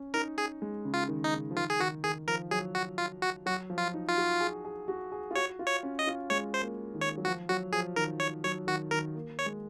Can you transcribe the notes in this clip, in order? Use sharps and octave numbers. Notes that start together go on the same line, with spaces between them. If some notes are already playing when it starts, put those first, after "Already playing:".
Already playing: C#4
D#4 A#4
G#4
G#3
C#3
F4
D#3
D#4
C#3
F3
D#3 F4
G#4
D#3 F#4
D#3 G#4
F3 A#4
F#3 G#4
F#4
F4
F#4
F#3 F#4
F3
F4
D#4
F4
F#4
G#4
G#4
F#4
G#4
F4
F#4 C#5
F4
C#5
C#4
D#5
F4
G#3 C#5
C5
A#3
D#3
C#5
F#3
F3 F#4
F#3 F#4
F3 G#4
D#3 A#4
C#5
F#3 C#5
D#3 F#4
D#3 A#4
A#3
C#5
G#3